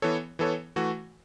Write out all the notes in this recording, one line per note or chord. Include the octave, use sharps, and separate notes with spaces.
E3 B3 A4 C#5
E3 B3 A4 C#5
E3 A3 F#4